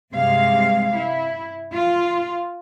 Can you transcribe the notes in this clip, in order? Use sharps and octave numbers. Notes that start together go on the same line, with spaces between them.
G2 C3 G#3 F5
E4
F4